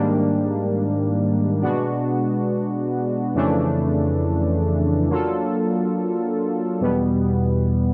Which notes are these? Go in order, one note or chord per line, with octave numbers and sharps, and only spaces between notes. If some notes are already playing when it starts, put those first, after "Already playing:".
Already playing: G#2 D#3 G3 A#3 D4
B2 G#3 B3 D4 F#4
F2 C#3 E3 A3 D4
F#3 A#3 D4 F4 A4
E2 B2 G3 B3